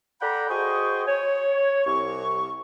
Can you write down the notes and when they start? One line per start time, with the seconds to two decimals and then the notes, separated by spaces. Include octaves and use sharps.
0.21 A4 D5 F#5 G5 A#5 B5
0.49 F#4 G#4 C5 D#5 G5 C#6
1.06 C#5
1.85 C2 C#6